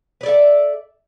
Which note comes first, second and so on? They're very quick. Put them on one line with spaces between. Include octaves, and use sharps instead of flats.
B4 D5 A4 E5